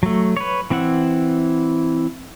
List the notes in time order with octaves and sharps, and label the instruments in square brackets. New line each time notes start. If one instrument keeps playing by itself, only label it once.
[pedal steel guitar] F#3 A3
B4 C#5
E3 C4 E4 F#5